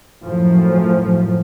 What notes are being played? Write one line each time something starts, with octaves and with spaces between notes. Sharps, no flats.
F#2 A2 F3